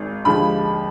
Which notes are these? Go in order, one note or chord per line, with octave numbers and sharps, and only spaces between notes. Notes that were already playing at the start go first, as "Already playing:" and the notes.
Already playing: G#1 G#2
D#2 D3 F3 G#3 B5